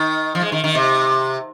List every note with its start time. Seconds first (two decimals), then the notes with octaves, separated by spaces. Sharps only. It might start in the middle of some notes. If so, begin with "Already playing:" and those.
Already playing: D#3
0.35 F3
0.41 G#3
0.52 D#3
0.64 D#3
0.75 C3